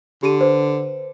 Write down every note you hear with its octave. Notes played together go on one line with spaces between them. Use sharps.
D3 G4 D#7
B4 C5